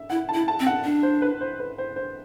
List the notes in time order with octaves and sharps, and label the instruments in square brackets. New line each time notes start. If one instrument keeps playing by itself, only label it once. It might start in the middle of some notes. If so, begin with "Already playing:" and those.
Already playing: [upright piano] E5
[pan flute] E4 [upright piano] F#5
[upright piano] A5
[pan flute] E4
[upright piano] A5
[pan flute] C4
[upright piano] F#5
[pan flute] D4
[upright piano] C5
B4
C5
B4
C5
C5